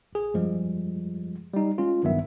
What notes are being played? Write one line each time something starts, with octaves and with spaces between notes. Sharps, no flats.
A#1 G#4
F#2 F3 G3 G#3
G3 D#4
G#3 C#4 F4
A#1 G2 D#3 F#3 B3 E5